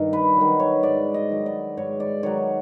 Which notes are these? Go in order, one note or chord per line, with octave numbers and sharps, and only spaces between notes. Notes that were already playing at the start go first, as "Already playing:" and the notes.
Already playing: G2 D#3
B4
D#3 F#3
C#5
G#2 D5
D#5
D#3 F#3
D5
G#2 C#5
D5
D#3 F#3 C#5